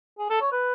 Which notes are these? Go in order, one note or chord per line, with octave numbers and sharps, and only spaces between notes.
G#4
A4
C#5
B4